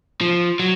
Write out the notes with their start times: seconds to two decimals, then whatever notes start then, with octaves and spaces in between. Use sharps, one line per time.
0.21 F3
0.60 F#3